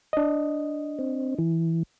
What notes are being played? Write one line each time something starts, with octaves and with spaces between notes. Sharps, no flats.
D4 D#5
C4
E3